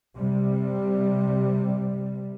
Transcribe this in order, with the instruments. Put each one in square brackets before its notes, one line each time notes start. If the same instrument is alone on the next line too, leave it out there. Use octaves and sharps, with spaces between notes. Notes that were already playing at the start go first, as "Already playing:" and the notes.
[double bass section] C3 G3